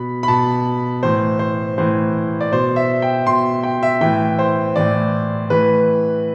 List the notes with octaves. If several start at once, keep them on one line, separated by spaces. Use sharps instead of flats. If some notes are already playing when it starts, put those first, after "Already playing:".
Already playing: B2 B5
B5
B2 A5
A2 E3 C5
C5
A2 E3 C5
D5
B2 C5
E5
G5
B2 C6
G5
E5
A2 E3 G5
C5
A2 E3 D5
A2 E3 B4